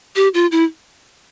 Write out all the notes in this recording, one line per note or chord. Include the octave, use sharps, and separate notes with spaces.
G4
F4
E4